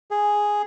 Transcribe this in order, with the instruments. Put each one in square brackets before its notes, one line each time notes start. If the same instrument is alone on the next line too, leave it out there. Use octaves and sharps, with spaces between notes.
[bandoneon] G#4